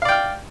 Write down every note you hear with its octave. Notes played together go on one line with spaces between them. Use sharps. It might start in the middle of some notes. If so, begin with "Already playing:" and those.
D5 F5 G5 F6